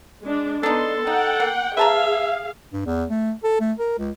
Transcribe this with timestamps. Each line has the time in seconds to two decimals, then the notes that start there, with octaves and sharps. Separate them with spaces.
0.23 G#3 D4
0.63 B3 D4 D#4 A4 C6
1.07 D#4 F#5 G5
1.40 A#3
1.77 G#4 B4 E5 F5 A5 A#5
2.73 G2
2.86 E2
3.10 A3
3.44 A4
3.60 A3
3.79 A#4
3.98 C#2